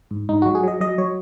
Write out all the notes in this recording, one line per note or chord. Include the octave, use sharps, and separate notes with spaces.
G#2
G#2 D#4
F#3 F#4
G#4
F#3 D#5
F#3 D#5
F#3 C#5